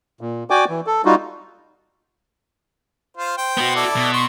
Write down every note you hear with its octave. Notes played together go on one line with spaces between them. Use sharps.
A#2
F#4 D5 G5 G#5 D6
E3
A4
G3 D#4 F4 F#4
F4 C5
C5 G5
B3 F#4
E4 A4 D5
B2
C6 C#6